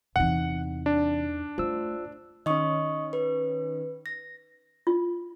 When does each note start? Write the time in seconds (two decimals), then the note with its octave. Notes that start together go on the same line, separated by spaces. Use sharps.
0.16 E2 C3 E3 D#4 F#5
0.86 D4
1.58 A3 F4 C5 E6
2.46 D#3 C#4 D#5 C#6 D#6
3.13 B4
4.06 A#6
4.87 F4